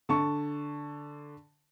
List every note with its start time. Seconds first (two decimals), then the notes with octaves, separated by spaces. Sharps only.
0.09 D3 A5 C#6